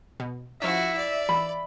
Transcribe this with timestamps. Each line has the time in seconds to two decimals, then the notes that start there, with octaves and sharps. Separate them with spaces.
0.20 B2
0.62 F3 C#4 E4 F#4 E5
0.97 D5
1.29 E3 B5